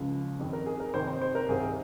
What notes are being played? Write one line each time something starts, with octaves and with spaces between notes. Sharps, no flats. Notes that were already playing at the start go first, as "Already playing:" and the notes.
Already playing: C#2 C#3 F3
F2 D#3
A#4
G#4
A#4
F2 C3 D#3 C5
C5
C5
A#4
C2 C3 D#3 G#4